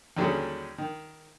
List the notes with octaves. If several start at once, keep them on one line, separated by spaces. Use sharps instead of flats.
D#2 D3 F#3 G3 C#4 G#4
D#3